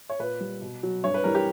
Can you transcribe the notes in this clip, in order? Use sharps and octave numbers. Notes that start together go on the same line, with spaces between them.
C#5
A#2 B4
G3
B2
F#3
G2 C#5
B4
E3 G3 A#4
G4